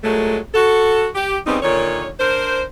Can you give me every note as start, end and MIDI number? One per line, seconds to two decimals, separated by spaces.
0.03 0.38 46
0.03 0.38 54
0.03 0.38 56
0.03 0.38 57
0.54 1.07 66
0.54 1.07 69
1.15 1.37 67
1.46 1.58 49
1.46 1.58 55
1.46 1.58 59
1.46 1.58 60
1.46 1.58 63
1.63 2.08 46
1.63 2.08 50
1.63 2.08 51
1.63 2.08 73
2.20 2.62 62
2.20 2.62 70
2.20 2.62 72